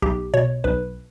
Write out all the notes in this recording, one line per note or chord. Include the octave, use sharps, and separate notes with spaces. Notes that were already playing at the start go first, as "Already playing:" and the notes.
B1 G4
B2 C#5
B1 B4